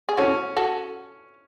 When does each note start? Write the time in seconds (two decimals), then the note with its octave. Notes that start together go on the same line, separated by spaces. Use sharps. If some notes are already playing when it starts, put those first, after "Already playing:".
0.09 G#4
0.17 C#4 F#4 A4
0.57 F#4 A4